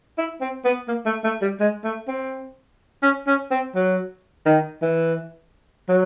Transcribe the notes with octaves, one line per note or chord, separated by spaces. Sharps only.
E4
C4
B3
A#3
A3
A3
G3
G#3
A3
C4
C#4
C#4
C4
F#3
D#3
E3
F#3